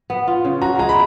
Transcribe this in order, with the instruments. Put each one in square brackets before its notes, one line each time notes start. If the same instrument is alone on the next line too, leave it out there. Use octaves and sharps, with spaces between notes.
[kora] B3
F4
C#3
[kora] F#4 [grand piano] A#5
[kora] G#3 [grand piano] A#5
[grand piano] B5